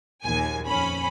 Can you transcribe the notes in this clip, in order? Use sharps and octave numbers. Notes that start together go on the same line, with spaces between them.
A#1 D#2 G#5
F2 C#4 B5